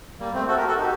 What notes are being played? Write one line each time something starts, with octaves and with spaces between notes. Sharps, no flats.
G3 A#3
A3 C4
F#4 A4
G4 A#4
F#4 A4
D#4 G4